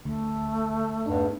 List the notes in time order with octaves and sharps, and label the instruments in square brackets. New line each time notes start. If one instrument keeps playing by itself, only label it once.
[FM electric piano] D2 D3 [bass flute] A3
[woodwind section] E2 G2 [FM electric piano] D4 D#4